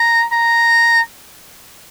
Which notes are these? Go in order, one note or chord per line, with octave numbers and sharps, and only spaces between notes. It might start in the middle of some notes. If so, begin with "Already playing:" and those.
Already playing: A#5
A#5